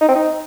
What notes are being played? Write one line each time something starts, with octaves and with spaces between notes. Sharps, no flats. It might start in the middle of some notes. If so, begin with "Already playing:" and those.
D#4
C4
D#4